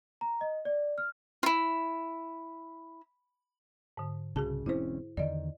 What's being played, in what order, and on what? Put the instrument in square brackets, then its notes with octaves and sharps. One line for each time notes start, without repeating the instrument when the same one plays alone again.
[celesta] A#5
D#5
D5
F6
[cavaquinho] E4 F4
[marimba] G#2 D3
[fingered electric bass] C2 C#3 [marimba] F#4 G#4 A5
[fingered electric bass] E1 C4 C#4 [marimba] E4 C5
[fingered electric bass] E2 D3 D#3 [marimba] D5 D#5